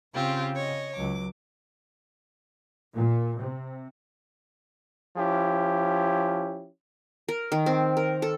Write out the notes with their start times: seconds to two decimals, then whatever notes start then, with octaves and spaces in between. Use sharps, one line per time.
0.13 C#3 C4 F4 G4
0.55 C#5 D#5
0.95 C#2 F#3 D6
2.94 A#2
3.40 C3
5.17 F3 C#4 E4 G4
7.28 A#4
7.52 D#3
7.66 C4
7.97 A#4
8.22 A4